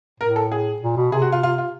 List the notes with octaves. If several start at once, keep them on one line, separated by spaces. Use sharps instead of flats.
A2 A#4
A4
G#4
A#2
B2
C3 G#4
F#4
F4
F4
F4